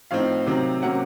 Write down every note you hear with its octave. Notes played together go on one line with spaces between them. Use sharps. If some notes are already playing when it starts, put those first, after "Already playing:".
A2 F3 C4 D#4 F5
C3 D#3 F#3 C4
C3 F#3 A#3 C#4 F#5